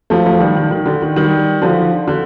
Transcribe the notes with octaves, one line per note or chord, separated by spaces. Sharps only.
F3 A3
F3 A3
D#3 G3
D#3
D#3
D3
D#3
D#3 G3
D3 F3
D3